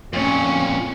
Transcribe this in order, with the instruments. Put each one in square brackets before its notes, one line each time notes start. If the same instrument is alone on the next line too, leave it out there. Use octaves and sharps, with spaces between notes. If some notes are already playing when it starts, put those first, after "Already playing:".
[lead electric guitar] F2 A#2 [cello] C#4